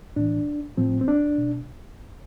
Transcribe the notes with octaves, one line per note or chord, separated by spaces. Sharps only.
A2 E3 D4
A2 F3 C4
C4
D4
B2